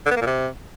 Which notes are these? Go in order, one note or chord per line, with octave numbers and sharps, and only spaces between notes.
D3
B3
A#3
A#2
C3